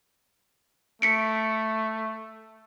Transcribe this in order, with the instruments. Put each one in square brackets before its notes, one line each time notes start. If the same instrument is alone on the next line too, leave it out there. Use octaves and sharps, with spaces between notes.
[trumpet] A3 [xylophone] B6 C#7 D7